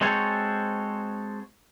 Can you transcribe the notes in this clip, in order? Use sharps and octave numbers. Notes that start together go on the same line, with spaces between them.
G#3 C4 F#4 A4 C5 C#5